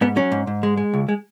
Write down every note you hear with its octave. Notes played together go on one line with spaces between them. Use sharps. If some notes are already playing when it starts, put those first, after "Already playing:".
G#2 B3
F#3 C#4
G#2
G#2
G#3
G#3
C#2
G#3